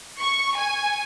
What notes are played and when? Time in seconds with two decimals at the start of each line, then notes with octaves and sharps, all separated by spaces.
0.20 C#6
0.56 G#5